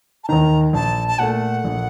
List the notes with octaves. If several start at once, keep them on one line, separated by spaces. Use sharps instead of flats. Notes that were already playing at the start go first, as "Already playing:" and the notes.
A5
D#2 D#3 A#5
A#1 A5
A5
A#2 A3 F#5
A#1